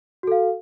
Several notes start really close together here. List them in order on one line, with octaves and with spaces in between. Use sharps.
F#4 A4 F5